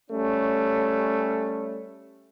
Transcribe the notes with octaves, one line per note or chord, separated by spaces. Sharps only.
G3 A3 C#4